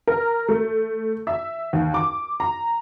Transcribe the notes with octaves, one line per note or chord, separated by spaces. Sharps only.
A#4
A3
E5
D#2
D6
A#5